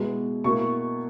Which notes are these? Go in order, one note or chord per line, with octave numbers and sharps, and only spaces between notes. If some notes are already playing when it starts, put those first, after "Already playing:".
Already playing: B2 G#3 B3 E4
B2 A#3 E4 C#6